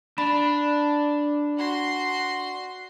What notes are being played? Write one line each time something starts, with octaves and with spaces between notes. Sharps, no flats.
D4 B5
F#4 C6